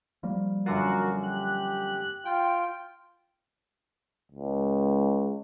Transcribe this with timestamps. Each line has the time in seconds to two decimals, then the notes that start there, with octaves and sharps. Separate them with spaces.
0.23 F3 G3 A#3
0.66 F#2 D3 F4 F#4 A#4
1.23 G4 F#6
2.25 F4 G5
4.32 C#2